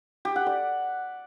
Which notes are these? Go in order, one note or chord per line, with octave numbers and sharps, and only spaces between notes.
G4
F#5
D5